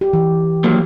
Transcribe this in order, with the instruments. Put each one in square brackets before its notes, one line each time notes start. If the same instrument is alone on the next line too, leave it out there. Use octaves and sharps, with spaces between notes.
[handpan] G4
E3
[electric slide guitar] F3 F#3 A#3